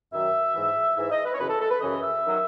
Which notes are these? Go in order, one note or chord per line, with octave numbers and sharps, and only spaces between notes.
F#2 D#3 F#3 E5
G#2 E3
G#2 E3 E5
D#5
B4
C#5
F#2 C#3 E3 B4
A4
A4
B4
F#2 C#3 E3 D#5
E5
D#3 F#3